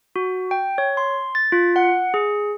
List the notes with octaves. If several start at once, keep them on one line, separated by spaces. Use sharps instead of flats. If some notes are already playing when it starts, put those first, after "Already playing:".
F#4
G5
C#5
C6
A6
F4
F#5
G#4